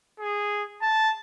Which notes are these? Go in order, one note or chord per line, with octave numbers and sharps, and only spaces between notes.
G#4
A5